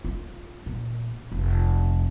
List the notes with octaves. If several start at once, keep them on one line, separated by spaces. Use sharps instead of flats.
F4
A#2
F1